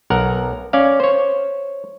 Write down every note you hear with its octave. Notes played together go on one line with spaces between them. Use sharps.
B1 A#4 F#5
C#4 D5 F5
C5 C#5